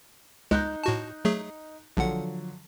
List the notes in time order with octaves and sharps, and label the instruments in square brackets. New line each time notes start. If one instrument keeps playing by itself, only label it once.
[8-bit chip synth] C#2 G#3 [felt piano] D#4 F#6 G6
[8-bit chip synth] A2 F#4 A5
F#3 A3 G#4
[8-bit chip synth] A#1 F#5 [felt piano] D3 F3 F#3